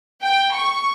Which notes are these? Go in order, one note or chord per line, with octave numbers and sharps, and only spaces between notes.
G5
C#6